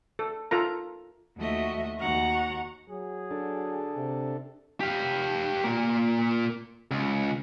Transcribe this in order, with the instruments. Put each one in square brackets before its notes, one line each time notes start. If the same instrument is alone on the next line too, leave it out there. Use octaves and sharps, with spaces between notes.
[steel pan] A4
F4 A4 A#4 A#5
[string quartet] D#2 F3 A3 F#4 D#5 E5
D#2 F#4 F#5 A#5 C#6
[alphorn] F#3 [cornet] G#4
[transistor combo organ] D4 A4
[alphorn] C3
[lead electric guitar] G4 F5
A#2 A#3
C#2